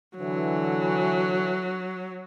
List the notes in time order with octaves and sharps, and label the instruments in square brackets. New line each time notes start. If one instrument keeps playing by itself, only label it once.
[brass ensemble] D3 E3 [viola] F#3